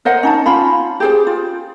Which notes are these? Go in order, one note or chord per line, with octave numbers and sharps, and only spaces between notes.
A#4 C5 D#5 F#5
C#4 D#4 A5
C#4 F4 F5 B5
G4 G#4 C5
F4